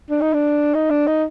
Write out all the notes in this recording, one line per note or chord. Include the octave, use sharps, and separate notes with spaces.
D4
D#4
D4
D#4
D4
D#4